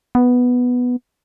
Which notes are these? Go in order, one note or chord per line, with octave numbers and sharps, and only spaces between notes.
B3